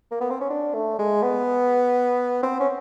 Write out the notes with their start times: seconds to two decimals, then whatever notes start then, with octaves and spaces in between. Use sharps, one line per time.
0.11 A#3
0.21 B3
0.30 C4
0.41 C#4
0.50 D4
0.74 A3
0.99 G#3
1.22 B3
2.43 C4
2.60 C#4